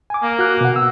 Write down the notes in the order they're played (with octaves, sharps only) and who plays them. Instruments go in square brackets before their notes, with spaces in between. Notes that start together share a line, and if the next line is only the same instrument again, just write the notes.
[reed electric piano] G#5 D6
[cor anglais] A#3
[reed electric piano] F#4 F#6
B2 F#5
E6